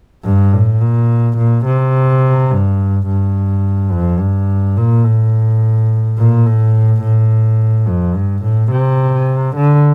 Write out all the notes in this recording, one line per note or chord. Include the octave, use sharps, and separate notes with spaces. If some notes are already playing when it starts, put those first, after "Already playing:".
G2
A2
A#2
A#2
C3
G2
G2
F2
G2
A#2
A2
A#2
A2
A2
F2
G2
A2
C3
D3